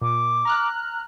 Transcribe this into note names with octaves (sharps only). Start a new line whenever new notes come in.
A#2 D6
A#5 F6 F#6